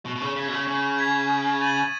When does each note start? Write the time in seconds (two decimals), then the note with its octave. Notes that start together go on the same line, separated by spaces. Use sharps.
0.05 B2 C#6
0.16 B2
0.21 C#3
0.36 C#3 G#6 B6
0.48 B2
0.52 C#3
0.67 C#3 C#6
0.98 G#6 B6
1.30 D#6
1.61 A6 D#7 F#7